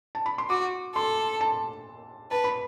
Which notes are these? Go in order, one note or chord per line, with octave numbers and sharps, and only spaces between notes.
A5
B5
C6
F#4 D6
A4 C6
A5
B4 A5
B5